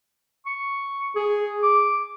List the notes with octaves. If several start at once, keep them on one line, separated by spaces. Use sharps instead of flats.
C#6
G#4
D6